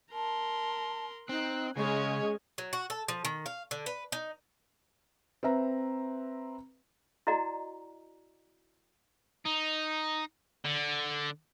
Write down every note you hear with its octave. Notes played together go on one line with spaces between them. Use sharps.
A#4 A5 C6
C4 D#4 F#6
C#3 G#3 C#4 C#5 D#5 G#5
F#3
F#4
A4
F3
D#3
F5
D3
B4
D#4
C4 B4 E5 A#5
E4 F#4 D5 D#5 F#5 A#5
D#4
D3